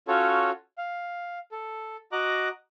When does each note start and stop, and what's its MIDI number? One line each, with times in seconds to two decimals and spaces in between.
0.08 0.51 61
0.08 0.51 65
0.08 0.51 66
0.08 0.51 69
0.08 0.51 73
0.78 1.39 77
1.52 1.96 69
2.12 2.48 66
2.12 2.48 75
2.12 2.48 82
2.12 2.48 86
2.12 2.48 90